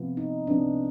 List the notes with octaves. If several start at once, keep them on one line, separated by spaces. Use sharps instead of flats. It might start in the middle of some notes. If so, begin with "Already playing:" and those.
Already playing: C3 F3 B3
D#4
C3 F3 B3 D4